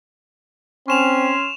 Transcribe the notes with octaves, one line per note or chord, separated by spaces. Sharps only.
C4 C#4 C6 C#6 E7 F7